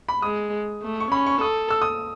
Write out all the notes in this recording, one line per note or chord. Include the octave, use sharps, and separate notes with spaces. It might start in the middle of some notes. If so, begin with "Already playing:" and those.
B5
G#3 D#6
A3
C#6
C#4 B5
C#6
A4 D#6
E6
D#6